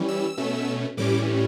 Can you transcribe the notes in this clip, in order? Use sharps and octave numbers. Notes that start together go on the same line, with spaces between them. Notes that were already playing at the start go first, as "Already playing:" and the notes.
Already playing: E3 G3 C#4
E6
B2 A3 C#4
A2 E3 G3 C#4 D6